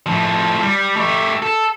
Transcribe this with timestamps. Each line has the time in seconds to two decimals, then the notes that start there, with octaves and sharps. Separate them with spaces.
0.06 A2 F3
0.62 G3
0.96 A3 G4
1.42 A4